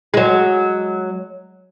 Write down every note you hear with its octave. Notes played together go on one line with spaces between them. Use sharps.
F#3 G#3